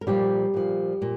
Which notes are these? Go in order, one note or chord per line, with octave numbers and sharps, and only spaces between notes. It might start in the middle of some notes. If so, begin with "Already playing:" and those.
A#4
A#2 F3 G3 G4
A#2 F3
A#2